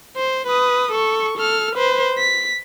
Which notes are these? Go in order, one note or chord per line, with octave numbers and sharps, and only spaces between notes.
C5
B4 D#6
A4 C#6
A4 F6
B4 C5
B6